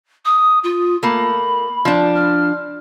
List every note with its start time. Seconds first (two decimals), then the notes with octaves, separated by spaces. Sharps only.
0.25 D#6
0.63 F4
1.03 A3 A#3 B5
1.85 F3 D4
2.15 F6